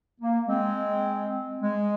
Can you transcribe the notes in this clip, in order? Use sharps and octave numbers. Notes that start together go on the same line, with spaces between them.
A#3
G#3 C4
G#3